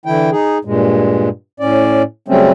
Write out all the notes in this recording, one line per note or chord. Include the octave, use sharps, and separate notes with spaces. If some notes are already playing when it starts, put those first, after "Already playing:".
D3 E3 E4 G5
D#4 G#4
G2 A#2 G#3
A2 C#4 D5
C#3 F#3 G3 A3 C4 C#4